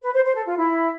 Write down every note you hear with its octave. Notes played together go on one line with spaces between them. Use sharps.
B4
C5
C5
A4
F4
E4